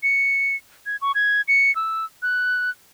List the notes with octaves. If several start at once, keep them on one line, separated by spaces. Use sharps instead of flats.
C#7
G#6
C#6
G#6
C#7
E6
F#6